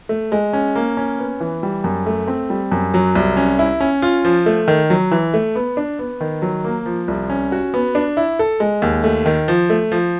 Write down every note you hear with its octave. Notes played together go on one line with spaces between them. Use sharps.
A3
G#3
C#4
A#3
C#4
B3
E3
G3
F#2
A3
C4
G3
F#2
F#3
C2
C#4
E4
C#4
F4
F3
A3
D#3
F#3
E3
A3
B3
D4
B3
D#3
F#3
A#3
F3
C2
C#4
F#4
B3
D4
E4
A4
G#3
D#2
A3
D#3
F3
A3
F3